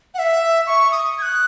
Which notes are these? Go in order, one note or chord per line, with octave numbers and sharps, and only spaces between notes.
F#5
E5
C#6
D#6
G#6
F#6